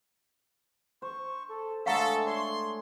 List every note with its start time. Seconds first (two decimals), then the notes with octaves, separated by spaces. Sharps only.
1.02 C5 C#6
1.49 A4
1.86 G#3 A3 D4 A4 F5 F#5 A#5 C#6
2.27 C#5 C6